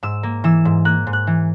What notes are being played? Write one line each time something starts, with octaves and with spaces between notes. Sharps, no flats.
G#2 E6
A#3
E3 E6
G#2
A#3 F#6
G#2
F#6
E3